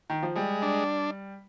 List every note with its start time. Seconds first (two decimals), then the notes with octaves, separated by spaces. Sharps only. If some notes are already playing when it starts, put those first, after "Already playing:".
0.10 D#3
0.23 F3
0.36 G3 G#3
0.62 D4